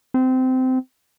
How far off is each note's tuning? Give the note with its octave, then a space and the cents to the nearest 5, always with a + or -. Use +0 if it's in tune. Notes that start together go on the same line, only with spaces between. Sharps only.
C4 -20